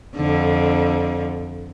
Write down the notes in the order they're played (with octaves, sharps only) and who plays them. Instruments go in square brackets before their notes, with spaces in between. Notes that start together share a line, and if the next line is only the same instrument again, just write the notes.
[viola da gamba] F2 D3